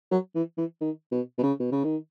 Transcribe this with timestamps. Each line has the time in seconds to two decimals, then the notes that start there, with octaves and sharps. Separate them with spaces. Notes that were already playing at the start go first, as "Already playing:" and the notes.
0.11 F#3
0.35 E3
0.58 E3
0.81 D#3
1.12 B2
1.38 B2
1.43 C#3
1.60 B2
1.72 C#3
1.84 D#3